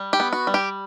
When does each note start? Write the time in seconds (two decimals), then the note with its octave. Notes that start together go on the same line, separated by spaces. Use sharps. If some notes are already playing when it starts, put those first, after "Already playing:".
Already playing: G3
0.13 G4
0.20 B3
0.33 F#4
0.47 G3
0.54 G4